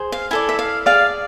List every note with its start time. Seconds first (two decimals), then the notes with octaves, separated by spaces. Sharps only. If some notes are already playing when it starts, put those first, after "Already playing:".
Already playing: G#4 C5
0.12 F5
0.31 E4 A4 D5 G#5
0.49 E5
0.59 F5
0.86 G#4 D5 F5